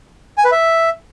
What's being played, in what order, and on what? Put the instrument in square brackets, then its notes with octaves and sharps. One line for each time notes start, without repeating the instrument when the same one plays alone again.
[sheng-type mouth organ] G#5
B4
E5